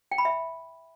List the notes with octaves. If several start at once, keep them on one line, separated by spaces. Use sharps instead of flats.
G5
B5
E5